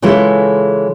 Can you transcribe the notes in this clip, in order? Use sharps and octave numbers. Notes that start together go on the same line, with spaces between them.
C#3 E3 G#3 E4 F4 A4